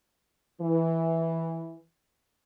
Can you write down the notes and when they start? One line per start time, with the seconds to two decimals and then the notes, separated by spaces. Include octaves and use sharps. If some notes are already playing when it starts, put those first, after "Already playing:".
0.61 E3